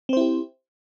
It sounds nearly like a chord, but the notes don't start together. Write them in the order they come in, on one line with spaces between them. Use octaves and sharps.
C4 C5 E4 G4